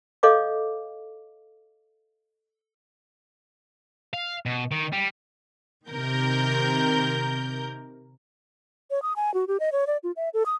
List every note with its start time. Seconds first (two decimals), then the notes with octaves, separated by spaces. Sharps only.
0.23 A4 C#5 D#5 F5 D6
4.13 F5
4.46 B2
4.71 D#3
4.93 G3
5.90 C3 D#3 A#4 G6
8.91 C#5
9.02 D#6
9.16 G#5
9.34 F#4
9.48 G4
9.60 D#5
9.72 C#5
9.87 D5
10.03 F4
10.16 E5
10.34 A4
10.46 D#6